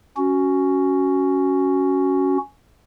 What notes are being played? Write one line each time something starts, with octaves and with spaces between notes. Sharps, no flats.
C#4 F#4